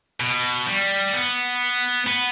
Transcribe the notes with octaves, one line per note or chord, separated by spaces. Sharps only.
B2
G3
B3
B3